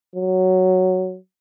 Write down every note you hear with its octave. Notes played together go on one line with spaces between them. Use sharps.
F#3